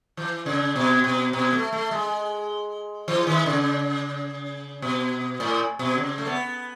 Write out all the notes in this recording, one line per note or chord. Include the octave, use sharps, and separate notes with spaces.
E3
C#3
B2
B2
B2
A3
A3
G#3
E3
D#3
C#3
B2
A2
B2
C#3
A3
B3